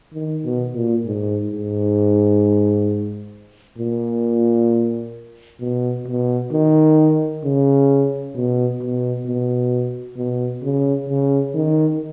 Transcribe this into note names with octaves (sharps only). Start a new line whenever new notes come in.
D#3
B2
A#2
G#2
G#2
A#2
B2
B2
D#3
C#3
B2
B2
B2
B2
C#3
C#3
D#3